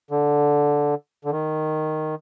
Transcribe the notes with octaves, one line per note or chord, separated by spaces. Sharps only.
D3
D3
D#3